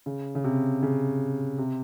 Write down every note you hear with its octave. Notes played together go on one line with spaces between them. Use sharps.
C#3
C#3
C3
C#3
C3